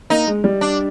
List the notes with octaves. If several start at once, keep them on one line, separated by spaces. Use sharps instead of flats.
A#3 D#4
G#3
G3
D4